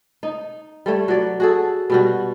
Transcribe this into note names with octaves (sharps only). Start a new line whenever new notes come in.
D#4
G3 A3 C#5
F#3 D5
F#4 G#4 A4
B2 G3 F#4